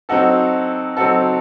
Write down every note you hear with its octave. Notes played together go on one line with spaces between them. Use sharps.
F#3 C4 D#4 F#4 A4
F#3 C4 D#4 F#4 A4